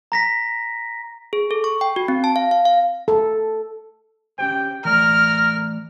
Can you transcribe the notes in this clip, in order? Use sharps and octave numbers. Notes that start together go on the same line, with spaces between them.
A#5 A#6 B6
G#4
A4
C#6
G5
F#4
C4
A5
F5
F5
F5
A4
C#4 G4 C5 G5
E3 A3 A#4 D5 F6